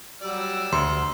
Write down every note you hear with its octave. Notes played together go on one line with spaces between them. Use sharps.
F#3 G3 D5 E6
D2 C6